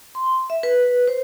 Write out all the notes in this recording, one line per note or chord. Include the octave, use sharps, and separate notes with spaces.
C6
E5
B4
C5